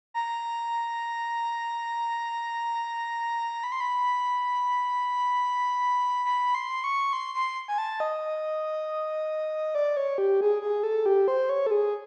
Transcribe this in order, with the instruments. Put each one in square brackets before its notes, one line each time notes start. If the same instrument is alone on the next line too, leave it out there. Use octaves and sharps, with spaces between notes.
[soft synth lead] A#5
B5
C6
B5
B5
C6
C#6
C6
C6
G#5
A5
D#5
D5
C#5
G4
G#4
G#4
A4
G4
C5
C#5
A4
G#4